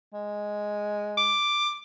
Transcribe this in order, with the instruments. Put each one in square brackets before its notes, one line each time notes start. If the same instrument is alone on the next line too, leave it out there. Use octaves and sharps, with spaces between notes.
[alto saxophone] G#3
[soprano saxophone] D6